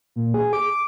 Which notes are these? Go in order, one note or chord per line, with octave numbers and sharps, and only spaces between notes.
A#2
G#4
D6